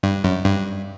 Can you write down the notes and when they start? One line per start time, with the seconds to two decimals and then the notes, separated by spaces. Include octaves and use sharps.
0.03 G2
0.24 F#2
0.45 G2